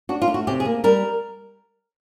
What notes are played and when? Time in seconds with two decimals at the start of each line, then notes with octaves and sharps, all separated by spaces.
0.09 D4 F#4
0.22 F4
0.28 A3
0.34 F#4
0.47 C3 G4
0.60 G#4
0.65 A#3
0.84 G3 A#4